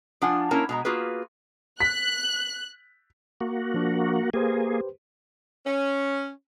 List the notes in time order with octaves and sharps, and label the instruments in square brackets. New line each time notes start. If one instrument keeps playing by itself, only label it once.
[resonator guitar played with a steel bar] F3 D4 F4 F#5 G#5
A#3 C#4 E4 A#4 C#5 A5
B2 G#3 A#5
A#3 F4 F#4 G#4 B4
[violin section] F#6 [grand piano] B6
[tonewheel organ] A#3 F#4
[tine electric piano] F3 D4
[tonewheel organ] A#3 G#4 [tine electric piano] G4 B4 C5
[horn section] C#4